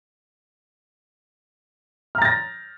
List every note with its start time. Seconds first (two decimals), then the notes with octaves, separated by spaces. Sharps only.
2.15 F6
2.18 A#5
2.22 A6
2.25 A#6